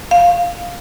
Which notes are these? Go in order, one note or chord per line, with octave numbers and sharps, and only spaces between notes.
F5